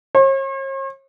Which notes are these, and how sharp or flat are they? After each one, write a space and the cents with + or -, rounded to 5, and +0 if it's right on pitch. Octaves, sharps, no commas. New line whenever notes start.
C#5 -45